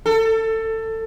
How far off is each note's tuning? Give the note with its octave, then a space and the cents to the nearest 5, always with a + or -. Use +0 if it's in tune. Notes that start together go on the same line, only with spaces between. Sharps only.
A4 +20